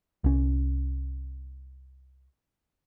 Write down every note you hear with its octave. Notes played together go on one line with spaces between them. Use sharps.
C2 C#4